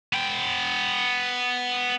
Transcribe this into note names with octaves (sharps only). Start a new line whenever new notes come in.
B3 G5